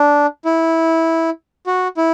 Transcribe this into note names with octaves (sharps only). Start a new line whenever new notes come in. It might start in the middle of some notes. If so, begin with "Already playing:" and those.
Already playing: D4
E4
F#4
E4